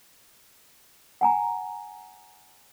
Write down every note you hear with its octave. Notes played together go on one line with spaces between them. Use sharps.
F#5 G#5 A#5